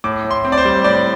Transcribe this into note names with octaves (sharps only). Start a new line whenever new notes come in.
A2 D6
A2
C6
C4
D5
C5
G3
A2 D5